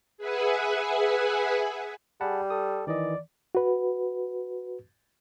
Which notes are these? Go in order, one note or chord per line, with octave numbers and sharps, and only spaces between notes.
G#4 B4 E5 F#5 G#5
G3 G#4 F#5 A5 B5
A4 D#6
D#3 E3 D5 D#5
F#4 B4